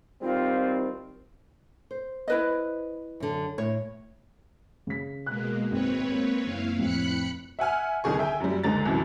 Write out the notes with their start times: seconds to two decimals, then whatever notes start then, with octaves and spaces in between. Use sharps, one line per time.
0.22 D#3 G3 C4 F4
1.91 C5
2.28 E4 B4 D#5
3.20 F#2 D3
3.58 A2 C#5
4.87 C#3 B6
5.26 B2 G#3 A#3 F#6
5.71 G#1 C4 B4 C#5
6.12 A#3
6.46 F#1 E4 F5
6.79 F2 A2 B5 F#6 C#7
7.59 E5 F#5 G#5 F6
8.04 C2 D3 D#3 G#4 C#6
8.19 E5 G5 G#5
8.40 F#2 G3
8.64 C#2 G#2 D3 A#5 A6
8.86 C2 F#2 E3